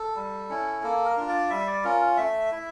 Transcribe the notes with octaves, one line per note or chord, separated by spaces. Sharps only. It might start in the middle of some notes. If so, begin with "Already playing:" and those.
Already playing: A4
G3
C#4 E4
A#3 A4
A#4
D4 F4
D5
G3 E5
D5
C#4 F4 A#4
A3 E5
E4